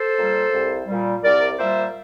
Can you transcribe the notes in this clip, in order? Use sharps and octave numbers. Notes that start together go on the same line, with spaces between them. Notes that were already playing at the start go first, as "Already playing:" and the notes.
Already playing: A4 C5
A#2 G3
C2
A#2 G3
C2 A#4 D5
A#2 G3 C5 E5